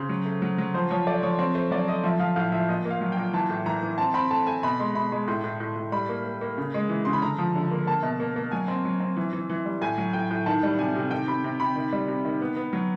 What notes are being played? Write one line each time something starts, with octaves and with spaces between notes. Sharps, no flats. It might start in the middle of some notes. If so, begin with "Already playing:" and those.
Already playing: C#3 C5
F#3
A3
F#3
F#3
F3 C5
F3 C#5
A3 D5
F3 C#5
C4 C#5
A3 C5
F#3 D5
A3 D#5
F3 E5
F3 F5
A2 F5
F3 E5
A#2 D#5
A#3
F5
F#3
A#2 G5
E3 A5
A2
E3 A#5
E3
C4 A5
C4 B5
A3 A5
A3 G#5
B2 B5
G#3 C6
B2 B5
G#3 B5
A2 C6
A2
A2
A2
G3 B5
A#3
A#3
A#3
C#3
G#3
E3
C#3 C6
B5
D3 A#5
F3
D3
A#3
A#3 A5
B2
A#3
A#3
F#3 G#5
C4
F#3
C4
E3
E3
E3
G3
A2 G#5
F#3
A2 G5
A2
D#3 A5
G3
C3 G#5
C3
D#3 G5
C3 B5
C3
C3 B5
D#3
G3
C3
D#3
B3
B3
F#3